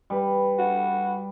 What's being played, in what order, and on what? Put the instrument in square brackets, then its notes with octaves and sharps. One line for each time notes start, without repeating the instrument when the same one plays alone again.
[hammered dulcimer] G3 B4
[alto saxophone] F#4